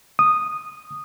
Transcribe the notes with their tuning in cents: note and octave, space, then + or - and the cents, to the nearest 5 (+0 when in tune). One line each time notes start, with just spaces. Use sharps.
D#6 -10